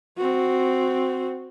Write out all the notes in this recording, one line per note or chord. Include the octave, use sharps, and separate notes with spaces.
C4 F#4